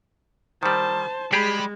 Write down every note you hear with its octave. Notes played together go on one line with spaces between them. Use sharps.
D#3 G3 C5 A5
G3 G#3 G4 G#4 D5 B5